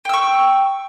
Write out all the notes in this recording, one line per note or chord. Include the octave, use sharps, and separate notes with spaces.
G5 C#6 E6